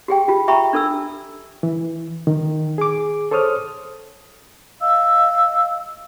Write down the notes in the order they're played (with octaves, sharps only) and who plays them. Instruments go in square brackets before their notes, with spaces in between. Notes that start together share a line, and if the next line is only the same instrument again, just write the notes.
[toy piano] G4 G#4 G5
F4 G4
E5 G5 A#5 B5 C#6
D4 A4 E6
[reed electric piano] E3
D#3
G#4 D6
A4 C5 C#5 D#6 F6
[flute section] D#5 F5 E6